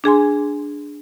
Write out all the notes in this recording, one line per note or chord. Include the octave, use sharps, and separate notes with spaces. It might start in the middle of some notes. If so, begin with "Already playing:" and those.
D4 G#4 G#5 C6